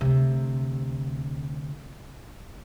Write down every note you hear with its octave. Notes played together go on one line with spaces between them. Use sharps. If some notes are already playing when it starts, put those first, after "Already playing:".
D2 C3